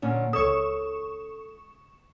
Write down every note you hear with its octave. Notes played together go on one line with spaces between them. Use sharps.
A#2 D3 C#4
C#2 A4 C#5 C#6 D#6 E7